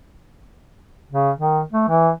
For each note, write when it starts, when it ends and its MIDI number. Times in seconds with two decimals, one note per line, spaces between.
1.11 1.31 49
1.37 1.61 51
1.72 1.85 57
1.89 2.11 52